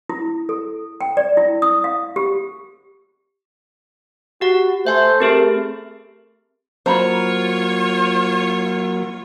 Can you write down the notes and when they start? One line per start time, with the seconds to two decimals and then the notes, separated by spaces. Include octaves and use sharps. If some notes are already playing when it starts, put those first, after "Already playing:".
0.09 E4
0.49 A4
1.01 G5
1.17 D5
1.37 E4
1.62 D#6
1.84 F5
2.16 G4
4.41 F#4 G4 F#5
4.87 A3 C5 E5 G#5
5.20 C4 G4 G#4 A#4
6.86 F#3 A#3 F4 C5 C#5 A#5 B5